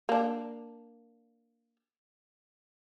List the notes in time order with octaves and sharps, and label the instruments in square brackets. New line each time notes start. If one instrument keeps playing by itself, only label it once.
[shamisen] A#3 D4